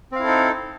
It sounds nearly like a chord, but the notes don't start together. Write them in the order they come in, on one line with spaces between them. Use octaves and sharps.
C4 F5 E4 A4 D#4